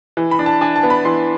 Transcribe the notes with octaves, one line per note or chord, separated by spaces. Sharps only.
E3
B5
D4
A5
D4 G#5
A5
B3
B5
E3 C6